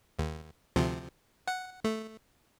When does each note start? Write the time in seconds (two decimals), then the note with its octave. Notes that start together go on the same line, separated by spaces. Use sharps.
0.19 D#2
0.76 D2 C3 F3
1.47 F#5
1.84 A3